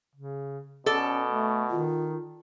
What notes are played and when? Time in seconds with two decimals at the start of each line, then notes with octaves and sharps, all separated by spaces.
0.15 C#3
0.86 B2 C#4 A4 D5
1.29 A3
1.70 D#3 F4